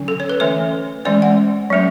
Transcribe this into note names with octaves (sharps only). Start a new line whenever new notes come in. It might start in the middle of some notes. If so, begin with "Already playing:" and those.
Already playing: D3 F#3 C#4
A4
C#5
B4
E3 A3 C#4 C#5
E3 G#3 C#4 D5
F#5
F#3 A3 C#4